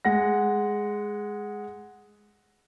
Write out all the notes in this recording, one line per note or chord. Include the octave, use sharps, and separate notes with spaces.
G#3 F#5 A#6